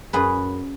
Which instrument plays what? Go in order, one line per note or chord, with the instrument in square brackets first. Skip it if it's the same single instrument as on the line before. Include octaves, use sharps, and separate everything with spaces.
[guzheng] F#2 G#4 B4